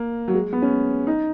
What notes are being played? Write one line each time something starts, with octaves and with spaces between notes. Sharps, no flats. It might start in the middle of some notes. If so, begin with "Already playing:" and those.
Already playing: A#3
F#3
G#3
B3
C#4
D#4